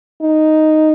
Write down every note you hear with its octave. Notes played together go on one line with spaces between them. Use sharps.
D#4